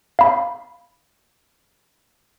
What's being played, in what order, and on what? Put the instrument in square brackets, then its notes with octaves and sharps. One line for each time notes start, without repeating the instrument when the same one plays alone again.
[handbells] F5 B5